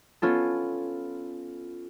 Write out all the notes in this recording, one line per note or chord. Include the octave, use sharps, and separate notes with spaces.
B3 C#4 F4 A4